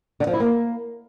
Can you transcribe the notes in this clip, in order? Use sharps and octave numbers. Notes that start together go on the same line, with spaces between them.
D3
F3
E4
A#3